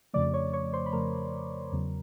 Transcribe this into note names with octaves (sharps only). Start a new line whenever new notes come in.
F2 C#3 F3 A3 D5 D6
C#5 C#6
C#5 C#6
C5 C6
B5
F2 C#3 F3 A3 A#4 A#5
E2 C#3 F#3